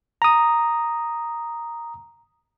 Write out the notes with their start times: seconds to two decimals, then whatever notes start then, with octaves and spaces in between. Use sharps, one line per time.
0.22 A#5 D#6